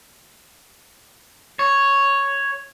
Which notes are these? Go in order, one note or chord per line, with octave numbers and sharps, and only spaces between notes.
C#5